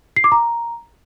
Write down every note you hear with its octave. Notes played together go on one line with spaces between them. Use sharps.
C7
D6
A#5